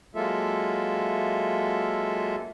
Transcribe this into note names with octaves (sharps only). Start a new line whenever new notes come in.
F#3 G#3 A#3 F4 A4 E5